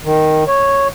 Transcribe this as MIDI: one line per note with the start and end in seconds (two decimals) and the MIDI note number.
0.04 0.44 51
0.47 0.88 73